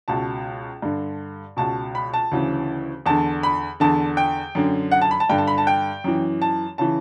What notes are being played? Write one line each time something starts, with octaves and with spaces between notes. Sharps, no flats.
C#2 B2 A5
G2 D3
C#2 B2 A5
B5
A5
D2 C#3 E3
E2 D3 A5
B5
E2 D3 A5
G5
F#2 D3
F#5
A5
B5
A5
G2 D3 G5
A5
B5
A5
G5
F#2 E3
A5
C#3 E3 A5